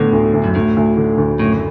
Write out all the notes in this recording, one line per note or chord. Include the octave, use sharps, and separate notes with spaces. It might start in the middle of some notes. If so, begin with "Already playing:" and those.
Already playing: A2 D3 B3
D2
D2
F#2
D2 A2
D2
D3
D2
F#1 A2